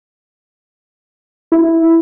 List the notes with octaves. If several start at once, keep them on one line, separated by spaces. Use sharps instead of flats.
E4